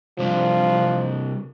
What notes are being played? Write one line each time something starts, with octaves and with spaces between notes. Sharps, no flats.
C3 F3 G3 D4